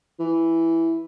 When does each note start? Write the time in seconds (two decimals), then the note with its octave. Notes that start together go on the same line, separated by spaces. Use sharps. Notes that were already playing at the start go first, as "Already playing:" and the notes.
0.19 E3